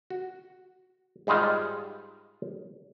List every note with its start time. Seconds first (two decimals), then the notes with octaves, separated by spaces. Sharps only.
0.10 F#4
1.27 G#2 G3 G#3 D#4 F4